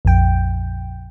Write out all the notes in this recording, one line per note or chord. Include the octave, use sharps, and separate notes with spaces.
A#1 F2 G5